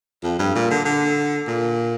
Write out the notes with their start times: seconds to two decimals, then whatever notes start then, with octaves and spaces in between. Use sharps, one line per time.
0.23 F2
0.39 G2
0.55 A#2
0.71 D3
0.85 D3
1.47 A#2